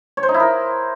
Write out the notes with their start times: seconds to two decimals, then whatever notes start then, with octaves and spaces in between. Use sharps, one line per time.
0.17 C#5
0.23 C5
0.29 D#4
0.34 E4
0.40 A#4